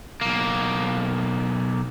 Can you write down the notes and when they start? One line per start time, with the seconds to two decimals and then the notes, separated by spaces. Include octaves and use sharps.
0.21 B1 A#3